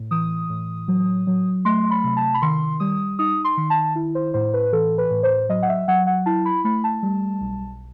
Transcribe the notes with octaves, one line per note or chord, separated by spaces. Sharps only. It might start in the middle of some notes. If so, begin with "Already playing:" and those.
Already playing: A2
E3 D#6
A2
F#3
F#3
A3 C6
B5
C3
A5
B5
D#3 C6
G3 D#6
D#4 D#6
C6
D#3
A5
E4
C5
A2 C5
B4
E3 A4
B4
A2
C5
F#3 D#5
F#5
E5
F#3 F#5
F#5
E4 A5
B5
A3 B5
A5
G3
B1